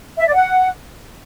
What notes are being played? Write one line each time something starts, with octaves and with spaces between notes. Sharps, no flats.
E5
D5
F#5